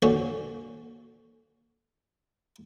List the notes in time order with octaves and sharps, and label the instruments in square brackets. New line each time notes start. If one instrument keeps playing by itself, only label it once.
[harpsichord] A#2 D3 C#4 F#4